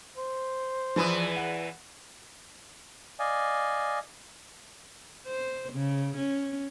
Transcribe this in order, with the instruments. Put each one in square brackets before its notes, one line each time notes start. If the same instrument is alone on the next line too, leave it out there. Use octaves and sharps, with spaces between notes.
[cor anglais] C5
[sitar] E2 E3 B4 [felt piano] F3 B5 D#6
[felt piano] F#5
[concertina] D5 D#5 F5 G#5
[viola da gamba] C5
C#3
C#4